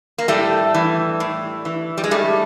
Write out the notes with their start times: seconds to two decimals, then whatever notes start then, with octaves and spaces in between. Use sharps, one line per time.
0.18 A#3
0.28 A2 G3 A3
0.74 E3
1.20 A2
1.65 E3
1.98 G3
2.04 G#3
2.11 G2 G3 A3